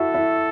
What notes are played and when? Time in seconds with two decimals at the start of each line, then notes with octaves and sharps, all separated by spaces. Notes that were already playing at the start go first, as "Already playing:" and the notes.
Already playing: E4 F#4 A4
0.14 E4